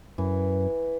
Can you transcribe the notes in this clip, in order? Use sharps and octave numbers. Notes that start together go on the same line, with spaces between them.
F#2 E3